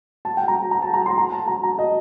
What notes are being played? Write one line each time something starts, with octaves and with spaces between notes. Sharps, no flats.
A5
G5
A#5
A#5
A5
A#5
C6
A#5
A5
A#5
A#5
D#5